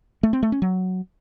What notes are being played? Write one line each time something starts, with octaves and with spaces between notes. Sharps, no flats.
A3
C4
A3
C#4
F#3